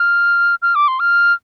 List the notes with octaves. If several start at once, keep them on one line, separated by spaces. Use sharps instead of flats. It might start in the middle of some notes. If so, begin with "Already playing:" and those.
Already playing: F6
F6
D6
C6
F6